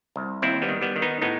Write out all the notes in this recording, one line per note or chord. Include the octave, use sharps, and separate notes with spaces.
C2
D#2 C4 E4
G3 B3
D#3
G3 B3
D#3
B3 D#4
A2 B3 D#4